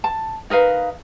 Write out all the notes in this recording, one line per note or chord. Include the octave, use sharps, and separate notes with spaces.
A5
D#4 A#4 B4 F5